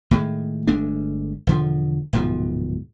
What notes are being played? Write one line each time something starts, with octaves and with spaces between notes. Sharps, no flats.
A2 D#3 G#3
G1 G#3 A3 D4
E1 D3 F3
D1 G#2 B2 F3